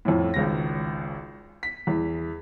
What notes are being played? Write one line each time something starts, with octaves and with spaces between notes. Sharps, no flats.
F2 A2
G#1 C#2 A#6
B6
E2